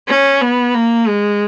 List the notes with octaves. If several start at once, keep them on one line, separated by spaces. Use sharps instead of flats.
C#4
B3
A#3
G#3